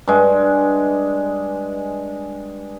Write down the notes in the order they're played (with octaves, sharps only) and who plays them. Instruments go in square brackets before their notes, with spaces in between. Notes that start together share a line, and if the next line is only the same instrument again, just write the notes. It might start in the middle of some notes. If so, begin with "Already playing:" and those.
[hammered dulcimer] G2 G#3